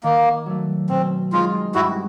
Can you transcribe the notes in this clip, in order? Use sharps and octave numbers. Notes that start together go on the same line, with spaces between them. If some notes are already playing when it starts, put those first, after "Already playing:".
D#3 A#3
F#3 A3
B2 C4
G#3 C4 D#4 F4
G2 E4 F#4